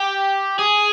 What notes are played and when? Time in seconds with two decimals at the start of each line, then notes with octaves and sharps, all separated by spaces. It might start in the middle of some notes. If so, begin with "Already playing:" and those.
Already playing: G4
0.59 G#4